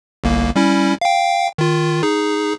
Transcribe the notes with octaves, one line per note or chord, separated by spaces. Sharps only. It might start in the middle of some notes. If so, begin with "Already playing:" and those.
G1 C2 A#3
G3 C#4 E4
F5 G5
D#3 F4
D#4 G#4